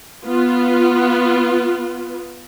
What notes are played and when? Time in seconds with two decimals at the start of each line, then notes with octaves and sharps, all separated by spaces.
0.25 B3 F4